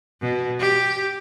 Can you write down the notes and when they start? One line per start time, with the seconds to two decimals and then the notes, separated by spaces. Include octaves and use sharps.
0.21 B2
0.60 G4